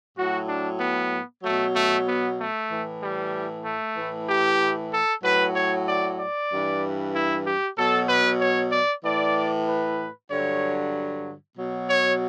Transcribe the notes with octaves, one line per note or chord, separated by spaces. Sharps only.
A2 F#3 F#4
D4
B3
B2 F#3 A3
A3
B3
A3
A2 E3
G3
A3
A2 E3
G4
A4
A2 F#3 B4
C#5
D5
D5
G2 E3
E4
G4
B2 F#3 A4
B4
C#5
D5
A2 E3 D5
B4
G2 D3 F#3 C#5
B2 F#3
C#5